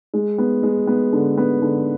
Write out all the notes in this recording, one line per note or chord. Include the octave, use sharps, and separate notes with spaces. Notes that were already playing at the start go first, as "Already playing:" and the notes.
G#3
B3
G#3
B3
D3
B3
D3